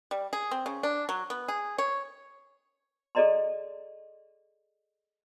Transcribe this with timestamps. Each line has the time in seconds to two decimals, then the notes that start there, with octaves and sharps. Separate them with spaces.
0.11 G3
0.33 G#4
0.51 C4
0.66 C#3
0.83 D4
1.09 F#3
1.30 B3
1.48 G#4
1.78 C#5
3.15 G#4 A4 D5 D#5 A#5 C6